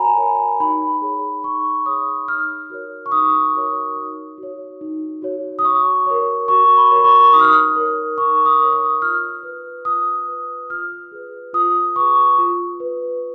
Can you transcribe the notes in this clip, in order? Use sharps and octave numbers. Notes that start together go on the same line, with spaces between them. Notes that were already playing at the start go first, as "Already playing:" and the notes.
Already playing: F#4 A#4 C#5 G#5 A#5 B5
A#4 C#5
D#4 B5
G#4 C#5
D#4 C#6
G#4 C#5 D#6
D#4 F6
F#4 A#4 C#5
C#6
D#4 D#6
F#4 A#4 C#5
D#4
F#4 C#5
D#4
F#4 C#5
D#6
F#4 C#6
A#4 C#5
F#4 C#6
B5
A#4 C#5
C#6
D#4 D#6
F6
D#6
A#4 C#5
D#4 C#6
D#6
A#4 C#5
D#6
F4 F6
B4
F4 D#6
B4
F4 F6
G#4 B4
F4 D#6
G#4 B4 C#6
F4
B4